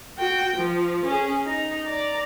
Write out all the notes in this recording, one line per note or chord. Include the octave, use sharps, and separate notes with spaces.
F#4 G5
F3
C#4 G#4
D#4 A#5
D5 A#5